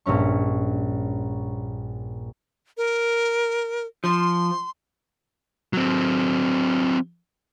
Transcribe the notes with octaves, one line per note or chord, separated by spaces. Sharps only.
A#1 G2 C#4 C#6
A#4
F3 C6
F#3 C4